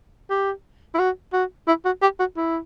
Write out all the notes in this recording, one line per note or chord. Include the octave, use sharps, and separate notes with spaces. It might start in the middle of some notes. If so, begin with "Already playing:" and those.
G4
E4
F#4
F#4
E4
F#4
G4
F#4
E4